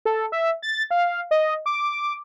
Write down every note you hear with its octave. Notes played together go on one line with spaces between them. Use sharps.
A4
E5
A6
F5
D#5
D6